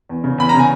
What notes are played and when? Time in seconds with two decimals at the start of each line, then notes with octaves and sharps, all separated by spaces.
0.09 E2
0.24 C#3
0.38 E2 B5
0.49 A#5
0.54 C#3
0.59 G#5